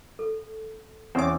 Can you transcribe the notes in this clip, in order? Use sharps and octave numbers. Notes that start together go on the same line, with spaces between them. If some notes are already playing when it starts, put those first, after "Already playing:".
A4
E2 C4 C#4 C5 C#5 D6